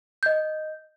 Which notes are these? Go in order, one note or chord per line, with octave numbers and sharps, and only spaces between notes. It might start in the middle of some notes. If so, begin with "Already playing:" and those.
D#5 G6